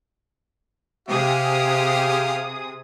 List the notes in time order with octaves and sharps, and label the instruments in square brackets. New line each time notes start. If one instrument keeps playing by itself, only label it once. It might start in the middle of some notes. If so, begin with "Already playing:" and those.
[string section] C3 G#4 D#6 [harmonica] G4 F5